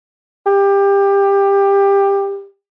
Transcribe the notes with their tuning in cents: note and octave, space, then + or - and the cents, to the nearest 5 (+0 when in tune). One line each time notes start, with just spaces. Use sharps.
G4 +20